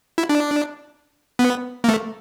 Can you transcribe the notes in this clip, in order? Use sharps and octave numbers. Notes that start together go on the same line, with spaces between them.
E4
D4
B3
A#3
A3